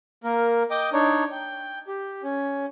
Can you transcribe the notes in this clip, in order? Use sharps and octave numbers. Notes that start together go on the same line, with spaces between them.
A#3 A#4
D#5 G5 D6 D#6
D4 D#4 C#5
G5
G4
C#4